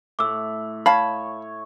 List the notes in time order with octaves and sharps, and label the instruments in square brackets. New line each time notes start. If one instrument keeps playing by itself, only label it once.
[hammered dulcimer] A2 [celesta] D6 E6
[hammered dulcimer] C#5 [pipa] F5 A5 [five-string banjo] B5